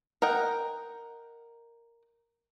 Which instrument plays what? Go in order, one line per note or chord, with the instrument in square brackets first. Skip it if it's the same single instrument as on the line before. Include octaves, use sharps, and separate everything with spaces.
[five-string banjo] A#4 D#5 F#5 G5